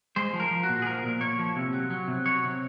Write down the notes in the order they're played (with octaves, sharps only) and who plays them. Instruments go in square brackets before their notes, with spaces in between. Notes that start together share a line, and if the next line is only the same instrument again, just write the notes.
[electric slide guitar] G#3 C5
F3
A#4
F3
F#4
A#2
G#4
F3 A#4
A#2
A#2 C#5
F3
C3
F#3
F#3
C3
F#3 C#5
C3